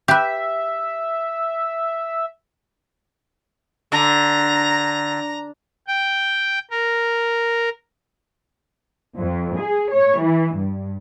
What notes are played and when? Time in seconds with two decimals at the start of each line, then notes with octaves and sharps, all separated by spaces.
0.08 G4 B4 E5
3.92 D3 A#5
5.88 G5
6.71 A#4
9.18 F2
9.60 G#4
9.92 C#5
10.21 E3
10.55 G2